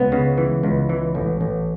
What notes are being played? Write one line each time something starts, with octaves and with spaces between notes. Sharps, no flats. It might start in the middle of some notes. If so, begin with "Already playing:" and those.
Already playing: C#2 B3
C#3
E3
C#2
E3
A1
A1